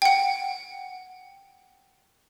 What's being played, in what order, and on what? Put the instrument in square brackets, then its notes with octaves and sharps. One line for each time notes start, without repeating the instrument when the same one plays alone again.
[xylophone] F#5 G5